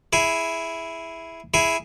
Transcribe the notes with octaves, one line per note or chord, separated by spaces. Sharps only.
E4 G#4
E4 G#4